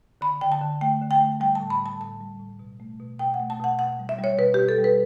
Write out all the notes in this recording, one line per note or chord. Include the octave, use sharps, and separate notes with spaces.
D3 B5
D3 G5
A5
D3
A3 G5
D3
G5
A3
G3 G5
A5
A2
B5
G3 A5
A2 A5
G3
A2
B2
A3
B2
B2 G5
F#5
A3
A5
B2 F#5
B2 F#5
G3
E5
G3
C#5
B2 B4
B2 G4
A4
G3
B4